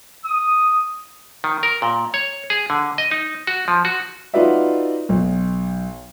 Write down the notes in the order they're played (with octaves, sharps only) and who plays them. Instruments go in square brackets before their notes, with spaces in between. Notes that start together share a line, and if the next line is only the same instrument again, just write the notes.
[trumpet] D#6
[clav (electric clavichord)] D#3
A#4
A#2
C#5
G#4
D3
D#5
D#4
F#4
F3
F#4
[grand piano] D#4 F4 F#4 B4 D5 E5
B1